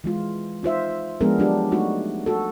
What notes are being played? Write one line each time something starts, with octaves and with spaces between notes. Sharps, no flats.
E3 G#3 F4
D#4 F4 C5 E5
F3 G#3 B3 D4 G#4 A#4
F#3 D4 G4
A3 D4 D#4 F#4
F#4 A4